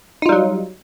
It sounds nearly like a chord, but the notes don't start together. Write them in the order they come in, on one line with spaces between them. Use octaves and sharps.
D#4 F4 G3 F#3